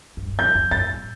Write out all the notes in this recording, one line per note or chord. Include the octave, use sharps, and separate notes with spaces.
G2
G2
F2 G6
F2
G2 A6
A2